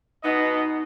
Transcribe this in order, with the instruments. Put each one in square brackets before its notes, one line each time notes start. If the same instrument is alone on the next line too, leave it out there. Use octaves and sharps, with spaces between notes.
[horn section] B2 B3 D#5 [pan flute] D#4